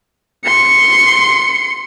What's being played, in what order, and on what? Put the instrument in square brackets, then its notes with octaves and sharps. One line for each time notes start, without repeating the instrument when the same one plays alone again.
[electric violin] C6 C#7